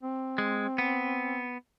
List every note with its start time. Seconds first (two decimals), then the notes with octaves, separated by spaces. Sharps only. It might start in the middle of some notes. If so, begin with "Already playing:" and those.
0.03 C4
0.38 G#3
0.78 B3